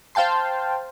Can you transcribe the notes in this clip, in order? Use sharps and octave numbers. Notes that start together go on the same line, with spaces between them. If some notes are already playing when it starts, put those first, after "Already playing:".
C5 F5 G5 A5 C6